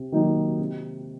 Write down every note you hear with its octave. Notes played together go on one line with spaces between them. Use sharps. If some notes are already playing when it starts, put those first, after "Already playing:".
Already playing: C3
D#3 F#3 A#3 D#4
C3